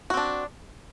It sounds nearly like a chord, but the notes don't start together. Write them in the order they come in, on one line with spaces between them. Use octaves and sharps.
F#4 C4 D4